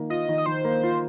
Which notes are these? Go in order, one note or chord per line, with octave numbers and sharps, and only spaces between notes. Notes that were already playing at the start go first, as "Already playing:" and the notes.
Already playing: D#3 A#3
F4 D#5
D#3
D#5
D#3 C5
A#3
F4